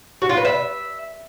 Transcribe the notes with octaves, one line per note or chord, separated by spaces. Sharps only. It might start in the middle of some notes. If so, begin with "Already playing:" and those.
F#4
F4
B4
E5